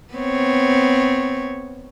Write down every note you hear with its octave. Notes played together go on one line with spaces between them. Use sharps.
B3 C4 C#5